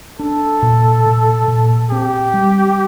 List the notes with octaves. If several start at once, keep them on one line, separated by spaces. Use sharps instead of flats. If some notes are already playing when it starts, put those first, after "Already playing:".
D4 A4
A#2
A#2
A#2
C4 G4
G3